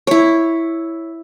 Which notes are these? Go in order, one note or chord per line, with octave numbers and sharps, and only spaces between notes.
E4 C#5